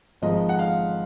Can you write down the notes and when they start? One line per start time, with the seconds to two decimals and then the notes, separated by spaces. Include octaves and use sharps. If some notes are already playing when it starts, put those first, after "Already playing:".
0.22 G#1 G#2 F3 G#3 D#5
0.49 F#5
0.59 F5